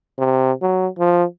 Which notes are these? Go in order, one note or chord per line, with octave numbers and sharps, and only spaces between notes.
C3
F#3
F3